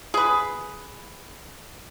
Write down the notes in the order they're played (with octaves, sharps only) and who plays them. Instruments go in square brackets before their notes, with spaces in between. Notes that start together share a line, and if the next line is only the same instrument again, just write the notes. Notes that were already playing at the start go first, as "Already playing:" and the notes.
[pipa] G#4 B4